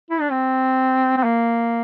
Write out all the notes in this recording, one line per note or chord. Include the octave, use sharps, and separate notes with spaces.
E4
D4
C4
C4
A#3